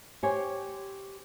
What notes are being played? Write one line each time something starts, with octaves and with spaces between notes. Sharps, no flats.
G4 C5 C#5 G#5